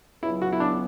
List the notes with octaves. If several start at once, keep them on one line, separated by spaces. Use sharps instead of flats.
C#2 C#3 F#3 B3 E4
F#4
E4
D4